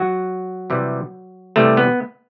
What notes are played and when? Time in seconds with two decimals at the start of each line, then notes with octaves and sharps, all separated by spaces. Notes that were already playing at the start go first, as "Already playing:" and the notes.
Already playing: F#3 F#4
0.70 C3 E3 G3
1.56 C3 E3 G3 A3
1.77 B3